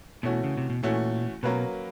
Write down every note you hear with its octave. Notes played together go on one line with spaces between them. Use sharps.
B2 E3 A3 C#4 F#4
C#3
C3
B2
A#2 E3 A3 C#4 F#4
B2 F#3 A#3 C#4 F#4 B4